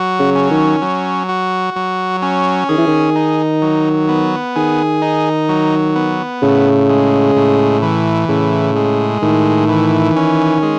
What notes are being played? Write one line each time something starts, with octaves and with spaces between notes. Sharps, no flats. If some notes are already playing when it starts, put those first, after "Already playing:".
Already playing: F#3 F#4
C#3
C#4
D#3
F#3
F#4
F#3
C#4
D#3 G#4
E3
D#3
D#4
F#3
B3
D#3 G#4
D#4
F#3
B3
A2 C#3
G#3
A2
E3
A2 C#3
G#3
A2 D#3
E3
C#4
G#3